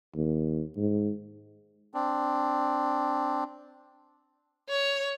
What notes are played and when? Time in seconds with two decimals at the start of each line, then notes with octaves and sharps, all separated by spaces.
0.16 D#2
0.76 G#2
1.94 C4 D4
4.69 C#5